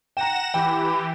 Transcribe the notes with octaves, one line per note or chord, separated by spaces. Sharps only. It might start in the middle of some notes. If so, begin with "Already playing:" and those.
F#5 G5 A#5 A#6 E7
E3 G4 G5 B5